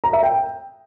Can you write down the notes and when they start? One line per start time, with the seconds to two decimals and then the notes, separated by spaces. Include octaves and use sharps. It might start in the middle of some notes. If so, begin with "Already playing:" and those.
0.04 A#5
0.13 E5
0.23 G5